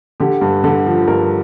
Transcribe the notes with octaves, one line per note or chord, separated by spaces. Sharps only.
D3 G4
G2
D3
F3
G2 A#4